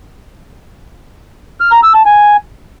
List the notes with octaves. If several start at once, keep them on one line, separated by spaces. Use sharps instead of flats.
F6
A#5
E6
A5
G#5